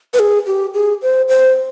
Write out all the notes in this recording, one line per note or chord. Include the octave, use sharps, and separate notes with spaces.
B4
G#4
G4
G#4
C5
C5